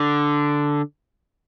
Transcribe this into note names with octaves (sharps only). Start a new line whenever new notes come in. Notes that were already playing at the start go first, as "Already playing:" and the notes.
Already playing: D3